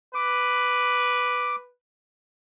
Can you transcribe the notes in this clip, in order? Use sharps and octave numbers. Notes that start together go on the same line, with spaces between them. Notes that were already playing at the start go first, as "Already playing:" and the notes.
B4 D6